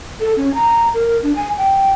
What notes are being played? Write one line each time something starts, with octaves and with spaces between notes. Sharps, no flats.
A4
C#4
A#5
A#4
D4
G#5
G5